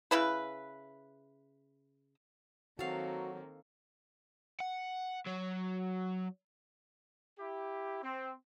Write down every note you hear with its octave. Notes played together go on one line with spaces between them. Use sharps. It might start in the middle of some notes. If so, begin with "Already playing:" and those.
C#3 E4 B4
D#3 F#3 A#3 C4 F#4 A4 F5
F#5
F#3
E4 G4
C4